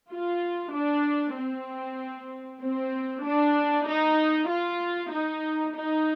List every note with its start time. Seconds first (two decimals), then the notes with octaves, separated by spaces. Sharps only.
0.11 F4
0.74 D4
1.36 C4
2.61 C4
3.23 D4
3.86 D#4
4.48 F4
5.11 D#4
5.73 D#4